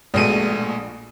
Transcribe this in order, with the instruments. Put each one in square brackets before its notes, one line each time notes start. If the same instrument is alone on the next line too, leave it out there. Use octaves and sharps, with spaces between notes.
[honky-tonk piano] A#1 D#7 [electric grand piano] B2 G#3 A3